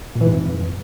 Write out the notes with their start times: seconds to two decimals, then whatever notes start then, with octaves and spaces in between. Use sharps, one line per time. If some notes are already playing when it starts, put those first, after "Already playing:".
0.15 A#2
0.21 E3
0.26 G#2
0.32 F2